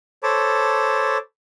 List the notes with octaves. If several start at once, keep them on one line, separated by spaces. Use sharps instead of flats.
A4 C5 C#5 A5 B5 D6